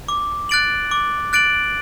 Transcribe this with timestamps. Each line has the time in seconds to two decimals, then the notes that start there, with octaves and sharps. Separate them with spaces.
0.08 D6
0.49 F#6 A6 D7 F#7
0.91 D6
1.33 F#6 A6 D7 F#7